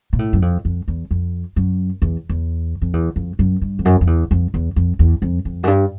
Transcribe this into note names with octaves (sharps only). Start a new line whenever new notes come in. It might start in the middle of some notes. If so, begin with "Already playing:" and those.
A#2
A2
F#2
F2
F2
E2
F2
F#2
E2
E2
F2
E2
F2
F#2
G2
F2
F#2
F2
E2
F2
E2
F2
E2
F2
F2
F#2
G2